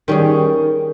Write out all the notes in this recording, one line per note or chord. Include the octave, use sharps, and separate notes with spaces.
D#3 G3 C#4 G#4